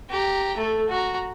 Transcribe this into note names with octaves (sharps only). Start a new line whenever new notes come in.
G4 A#5
A3 A4
F#4 A#5